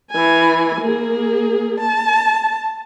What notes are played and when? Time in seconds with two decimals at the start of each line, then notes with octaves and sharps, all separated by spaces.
0.11 E3 G#5
0.81 A#3 G#4
1.80 A5